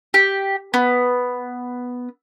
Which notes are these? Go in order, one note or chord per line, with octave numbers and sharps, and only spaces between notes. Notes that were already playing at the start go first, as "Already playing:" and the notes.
G4
B3